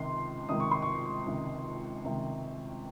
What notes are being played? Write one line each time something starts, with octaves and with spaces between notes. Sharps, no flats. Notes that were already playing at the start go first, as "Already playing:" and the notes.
Already playing: C#2 C3 D#3 C6
C#2 C3 D#3 D#6
C#6
C6
C#6
C#2 C3 D#3
C#2 C3 D#3